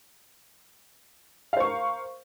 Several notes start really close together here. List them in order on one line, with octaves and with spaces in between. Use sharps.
F5 C5 C#6 A#4